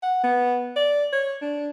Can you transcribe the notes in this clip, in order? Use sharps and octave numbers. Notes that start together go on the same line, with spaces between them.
F#5
B3
D5
C#5
D4